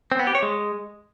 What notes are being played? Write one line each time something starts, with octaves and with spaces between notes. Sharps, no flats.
C4
B3
G4
C#5
G#3